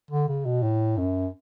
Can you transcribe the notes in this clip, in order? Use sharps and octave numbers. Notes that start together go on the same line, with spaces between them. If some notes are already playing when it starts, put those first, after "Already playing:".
D3
C#3
B2
A2
F#2